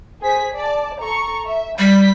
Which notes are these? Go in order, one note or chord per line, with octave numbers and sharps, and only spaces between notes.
G#4 C5 B6
D5 A5
A4 A#5 C#6
E5
G3 B5 G6 B6